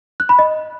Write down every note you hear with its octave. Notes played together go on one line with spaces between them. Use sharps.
F#6
B5
D#5